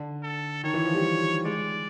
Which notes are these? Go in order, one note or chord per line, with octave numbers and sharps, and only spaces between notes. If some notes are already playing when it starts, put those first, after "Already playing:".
Already playing: D3
A4
D#3 C#5
E3
F3
G3
G#3 D5